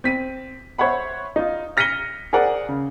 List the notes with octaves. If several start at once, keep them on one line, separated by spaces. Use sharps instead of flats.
C4 B6 D#7
C5 C#5 E5 F#5 B5
D#4 F4
F6 A#6 B6 C#7 D#7 G7
G#4 A#4 C5 D5 F#5
C#3